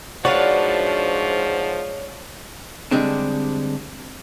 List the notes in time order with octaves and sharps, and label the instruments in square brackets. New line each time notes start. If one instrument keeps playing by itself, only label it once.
[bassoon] G#2 [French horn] F3 [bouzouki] D4 C#5 D5 [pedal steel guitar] F#4 B4 F5
[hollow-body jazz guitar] D3 G3 G#3 C4 D4